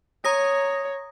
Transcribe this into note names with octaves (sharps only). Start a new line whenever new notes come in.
C#5 A#5 D#6 A#6